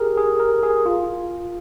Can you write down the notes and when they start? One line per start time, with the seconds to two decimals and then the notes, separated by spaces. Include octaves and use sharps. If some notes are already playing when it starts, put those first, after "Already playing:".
Already playing: G4 G#4 A#4
0.17 G#4
0.40 A#4
0.63 G#4
0.86 F4